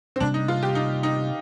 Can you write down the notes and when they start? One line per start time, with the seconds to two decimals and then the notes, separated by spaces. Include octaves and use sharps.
0.16 C4
0.20 C3 G3 A#3 D4
0.34 D#4
0.48 F4
0.63 G4
0.75 D#4
1.03 D#4